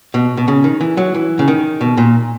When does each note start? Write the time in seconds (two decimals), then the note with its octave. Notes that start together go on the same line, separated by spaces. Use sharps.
0.14 B2
0.37 B2
0.48 C#3
0.64 D#3
0.81 E3
0.97 F#3
1.15 E3
1.39 C#3
1.48 D#3
1.81 B2
1.97 A#2